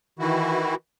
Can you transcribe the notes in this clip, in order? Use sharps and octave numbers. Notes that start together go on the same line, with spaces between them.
D#3 E3 E4 F#4